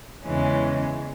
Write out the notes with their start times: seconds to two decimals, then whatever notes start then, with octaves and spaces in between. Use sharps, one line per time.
0.24 E2 C#3 E3 G#3 C#4